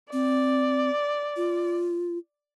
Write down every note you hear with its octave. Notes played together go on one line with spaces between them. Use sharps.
C4 D5
F4